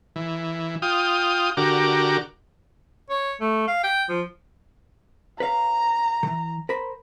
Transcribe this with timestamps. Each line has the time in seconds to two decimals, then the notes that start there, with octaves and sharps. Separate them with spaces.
0.16 E3
0.82 F4 G5 D#6
1.57 D3 F#4 G4 A#4 D6
3.10 C#5
3.41 A3
3.68 F5
3.84 G5
4.09 F3
5.40 B4 C#5 F5 A#5
6.23 D#3 E3
6.69 A#4 C5 B5